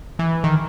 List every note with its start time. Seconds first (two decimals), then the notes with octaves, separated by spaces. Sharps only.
0.19 E3
0.44 D#3